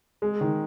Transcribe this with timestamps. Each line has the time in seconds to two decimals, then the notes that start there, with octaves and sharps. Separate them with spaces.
0.22 G#3
0.41 D#3